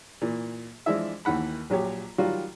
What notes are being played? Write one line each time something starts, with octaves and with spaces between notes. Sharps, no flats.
A#2 E3
E3 F3 G#3 D4 E4 E5
D#2 D#3 E3 F#5 B5
A#1 F#3 G4 C#5
D#3 F#3 G3 F4 F#4